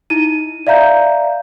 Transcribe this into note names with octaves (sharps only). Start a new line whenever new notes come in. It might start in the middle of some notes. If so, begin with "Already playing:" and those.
D#4 E4 D#7
D5 E5 F5 A#5 G6